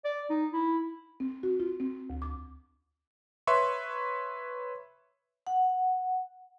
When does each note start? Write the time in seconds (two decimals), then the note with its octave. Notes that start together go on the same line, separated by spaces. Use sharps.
0.05 D5
0.30 D#4
0.53 E4
1.20 C4
1.43 F#4
1.60 F4
1.80 C4
2.10 D2
2.22 D6
3.47 B4 C#5 E5 C6 C#6
5.47 F#5